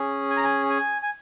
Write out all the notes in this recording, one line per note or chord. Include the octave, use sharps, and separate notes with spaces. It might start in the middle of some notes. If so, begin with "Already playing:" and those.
Already playing: C#4 G#4
G#5
A#5
G#5
G#5
G#5